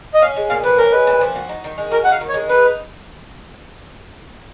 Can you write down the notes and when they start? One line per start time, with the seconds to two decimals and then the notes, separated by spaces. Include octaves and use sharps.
0.14 D#5
0.22 C#4 F5
0.36 G#3
0.50 A#2 F5
0.64 F3 B4
0.78 C#4 A#4
0.92 G#3 B4
1.07 A#2
1.21 F3
1.36 F#4
1.49 D#4
1.64 D#3
1.78 G#3
1.91 F#4 A#4
2.04 D#4 F#5
2.11 F5
2.21 D#3
2.29 C#5
2.34 G#3
2.49 D#4 B4